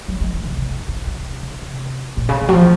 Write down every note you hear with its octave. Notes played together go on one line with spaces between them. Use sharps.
F#3
G#3
D#3
C#3
C3
C#3
C#3
C3
C#3
C3
A#2
C#3
D#3
F#3
F3